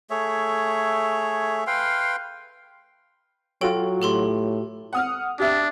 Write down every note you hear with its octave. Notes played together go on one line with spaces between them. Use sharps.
A3 G#4 C#5 E5
B4 F5 G5 C6
F#3 F4 F#4 A4 C#5 G5
A2 G4 A4 C6
F#5 D#6 F6
D4 G4 E5